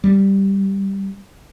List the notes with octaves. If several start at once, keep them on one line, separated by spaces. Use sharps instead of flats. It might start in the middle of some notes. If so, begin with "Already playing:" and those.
G3